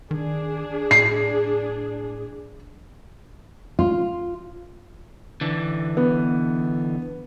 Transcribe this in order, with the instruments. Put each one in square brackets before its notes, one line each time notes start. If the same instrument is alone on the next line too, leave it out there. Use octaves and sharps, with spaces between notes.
[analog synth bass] D#3 [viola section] D4 G#4
[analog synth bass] A2 [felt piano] C7
[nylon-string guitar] F4
[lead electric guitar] D3 E3
[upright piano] B3